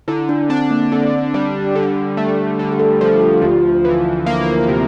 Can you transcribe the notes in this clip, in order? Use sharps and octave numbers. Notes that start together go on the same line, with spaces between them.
D3 E4
D4
C4 D4
A#3
D3 C4
G3
D3
A3
D3 D4
G4
A4
F3 A4
G4
D2 F4
E3
A#3
C3